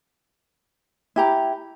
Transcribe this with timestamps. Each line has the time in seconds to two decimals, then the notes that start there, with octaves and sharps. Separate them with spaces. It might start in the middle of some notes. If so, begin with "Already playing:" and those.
1.16 E4 G4 A#5